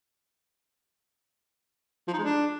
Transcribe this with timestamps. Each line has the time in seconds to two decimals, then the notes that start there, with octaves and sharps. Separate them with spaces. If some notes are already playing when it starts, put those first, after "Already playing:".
2.08 F3
2.13 D#4
2.19 G#3
2.24 D4